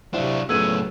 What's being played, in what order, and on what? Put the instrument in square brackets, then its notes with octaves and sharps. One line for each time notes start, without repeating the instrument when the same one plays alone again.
[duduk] C3 [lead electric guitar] F#3 D4 [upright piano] E4 C5 F5
[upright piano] C#2 A3 [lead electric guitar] A2 B3 [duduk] F#3 [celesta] E6 G#6 D#7